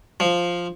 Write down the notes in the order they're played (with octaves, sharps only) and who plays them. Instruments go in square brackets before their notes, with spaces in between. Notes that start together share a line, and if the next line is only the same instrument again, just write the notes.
[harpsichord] F3